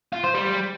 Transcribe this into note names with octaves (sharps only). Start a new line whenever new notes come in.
F4
C5
G3